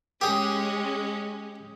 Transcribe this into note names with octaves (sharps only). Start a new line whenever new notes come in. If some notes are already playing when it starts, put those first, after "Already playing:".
G#3 C#4 G4 G#4